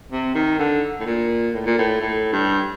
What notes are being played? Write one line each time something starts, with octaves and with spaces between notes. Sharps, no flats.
C3
D#3
D3
A2
A#2
A2
A#2
A2
A2
G2